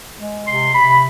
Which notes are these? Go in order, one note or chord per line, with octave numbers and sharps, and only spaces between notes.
G#3
C3 C6
C3 B5